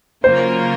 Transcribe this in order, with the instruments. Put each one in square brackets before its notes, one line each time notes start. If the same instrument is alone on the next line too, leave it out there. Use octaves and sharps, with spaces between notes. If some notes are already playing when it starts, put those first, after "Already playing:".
[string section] C#3 F#3 A#3 F4 A#4 [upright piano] C5